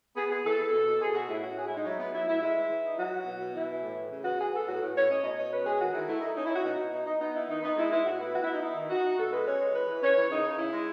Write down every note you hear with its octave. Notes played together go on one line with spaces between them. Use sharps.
B3 G#4
B3 G#4
E3 A4
B3
B2
B2
B2 G#4
B2 F#4
A2 E4
C#4 F#4
A2 G#4
E4
G#3
D#4
F#3 E4
B3
F#3 E4
A2 E4
G#3 E4
E3
E3
D#4
F#3 F#4
F#3
B2
B2
E3 E4
E3
A2
E3
C#3
B3 F#4
B3 G#4
B3 A4
A2 F#4
A2
A2 C#5
C#4 D#5
B2 D#5
B2 C#5
C#4 B4
G#3 G#4
D#3 F#4
D#3 E4
A3 E4
D#4
C#4 D#4
E4
C#4 F#4
B2 D#4
B2
D#4
D#4
B3 D#4
D#4 E4
D#3 D#4
B3 D#4
G#3 E4
G#3 E4
A2 F#4
B3 E4
E3 F#4
E4
B3 D#4
D#4 E4
D#3
D#4 F#4
D#4
B2 A4
G#3 B4
C#4 C#5
G#3
E3 B4
E3
C#4 C#5
E3
C#3 D#4
C#3
C#3 E4
G#3